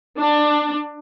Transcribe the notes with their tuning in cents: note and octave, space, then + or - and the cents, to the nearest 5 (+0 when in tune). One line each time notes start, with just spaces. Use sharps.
D4 +20